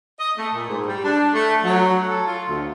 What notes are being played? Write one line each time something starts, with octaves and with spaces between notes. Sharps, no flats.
D#5
A3
A#2
G#2
G3
D4
A3
F#3
A4
F4
D2